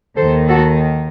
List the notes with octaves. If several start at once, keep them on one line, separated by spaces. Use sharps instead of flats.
D#2 D#3 A4 C5
F#4 A4